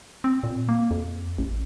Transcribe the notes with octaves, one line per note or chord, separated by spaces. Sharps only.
C4
A#2
A#3
F2
A1